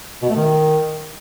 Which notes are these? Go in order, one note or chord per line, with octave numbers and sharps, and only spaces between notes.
B2
A3
D#3